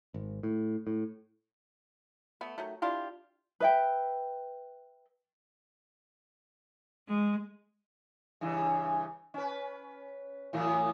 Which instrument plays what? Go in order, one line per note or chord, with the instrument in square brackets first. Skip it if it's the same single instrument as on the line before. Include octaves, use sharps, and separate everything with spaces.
[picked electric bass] G#1
A2
A2
[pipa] A3 B3
D#3 F#3 A3
D4 E4 F4 G4
[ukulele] B4 E5 G5
[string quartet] G#3
[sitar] G2 C#3 E3
C#4 B4
A2 E3 F#3